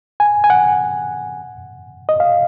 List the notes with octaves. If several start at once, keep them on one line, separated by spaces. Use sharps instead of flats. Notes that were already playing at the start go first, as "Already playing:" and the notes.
G#5
G#5
F#5
D#5
F5